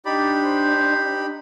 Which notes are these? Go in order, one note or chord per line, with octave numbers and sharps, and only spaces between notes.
D4 D#4 G4 D5 B5
C5